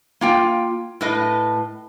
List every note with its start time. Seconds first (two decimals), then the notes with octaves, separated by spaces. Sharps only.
0.21 A#3 F4 G5
1.01 A2 B4 D#5